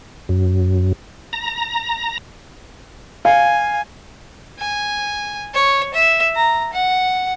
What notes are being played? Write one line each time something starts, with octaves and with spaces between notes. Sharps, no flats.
F#2
A#5
F5 G#5
G#5
C#5
E5
A#5
F#5